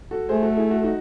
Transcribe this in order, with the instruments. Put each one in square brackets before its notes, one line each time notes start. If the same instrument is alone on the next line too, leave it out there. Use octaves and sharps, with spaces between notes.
[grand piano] F#4 A4
[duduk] A3 [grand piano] G#4 C5
[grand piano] F#4 A4
E4 G#4
F#4 A4
D#4 F#4